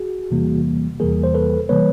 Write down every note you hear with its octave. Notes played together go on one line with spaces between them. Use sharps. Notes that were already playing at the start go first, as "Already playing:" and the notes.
Already playing: F#4 G#4
E2 C3 E3 G3 A#3
E2 C3 E3 G3 A#3 G#4 A#4
C5
A4 B4
C3 E3 G3 A#3 B4 C#5